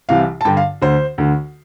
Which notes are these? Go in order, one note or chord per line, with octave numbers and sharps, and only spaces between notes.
C2 C3 E3 F5
A5
G2 D3 G5
F5
D2 D3 C5
D2 D3